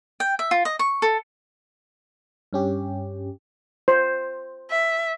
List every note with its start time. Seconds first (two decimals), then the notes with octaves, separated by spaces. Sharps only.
0.20 G5
0.39 E5
0.51 F4
0.65 D#5
0.79 C#6
1.02 A4
2.53 G2 C#4 G4
3.88 C5
4.70 E5